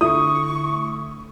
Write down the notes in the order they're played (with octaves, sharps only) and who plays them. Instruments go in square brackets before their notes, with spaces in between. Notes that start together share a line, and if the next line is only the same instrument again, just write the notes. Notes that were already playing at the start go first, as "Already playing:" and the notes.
[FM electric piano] D3 A3 [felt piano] E4 [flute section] C#6 [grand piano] D#6